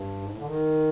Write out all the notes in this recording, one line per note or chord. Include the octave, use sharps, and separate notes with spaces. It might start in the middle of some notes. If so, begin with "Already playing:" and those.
Already playing: G2
G#2
A2
D3
D#3